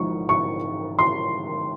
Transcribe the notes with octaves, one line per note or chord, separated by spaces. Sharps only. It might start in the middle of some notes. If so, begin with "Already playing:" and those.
Already playing: G#1 G#2 F3 C#6
C#6
C6